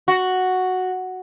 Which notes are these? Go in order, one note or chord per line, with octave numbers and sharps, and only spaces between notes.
F#4